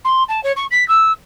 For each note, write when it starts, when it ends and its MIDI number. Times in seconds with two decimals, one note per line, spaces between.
0.05 0.23 84
0.29 0.43 81
0.44 0.52 73
0.56 0.65 85
0.71 0.86 95
0.88 1.12 88